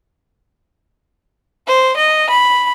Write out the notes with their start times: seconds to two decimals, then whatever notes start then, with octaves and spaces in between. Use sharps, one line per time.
1.67 C5
1.97 D#5
2.30 B5